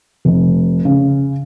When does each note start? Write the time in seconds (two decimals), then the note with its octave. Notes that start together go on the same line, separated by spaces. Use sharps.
0.25 F1
0.85 C#3